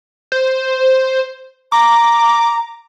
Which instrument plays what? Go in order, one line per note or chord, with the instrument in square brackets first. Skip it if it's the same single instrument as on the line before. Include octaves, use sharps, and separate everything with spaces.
[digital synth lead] C5
[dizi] A#5 [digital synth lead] D6